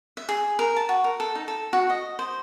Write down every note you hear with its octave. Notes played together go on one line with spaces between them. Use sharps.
E5
G#4
A#4
A5
F#4
A#4
A4
D#4
A4
F#4
D#5
C5